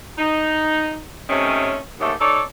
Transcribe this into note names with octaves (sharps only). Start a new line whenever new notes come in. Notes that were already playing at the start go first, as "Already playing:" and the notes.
D#4
C3 D#3 A3 C#4
D#2 G#2 A3 G4 A4 C#5
D#4 A4 C#5 D5